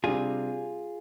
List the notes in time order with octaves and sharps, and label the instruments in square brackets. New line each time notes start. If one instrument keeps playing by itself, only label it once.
[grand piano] C3 G3 D4 [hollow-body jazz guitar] F4 G#4